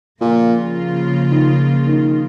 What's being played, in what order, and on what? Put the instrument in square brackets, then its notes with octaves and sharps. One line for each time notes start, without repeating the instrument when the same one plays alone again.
[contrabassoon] A#2 [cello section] C#3 F3 A#3 F4
[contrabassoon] D#3
D#3